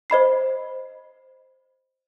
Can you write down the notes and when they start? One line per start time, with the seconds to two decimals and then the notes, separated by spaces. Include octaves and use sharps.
0.10 C5 D#5 B5 C7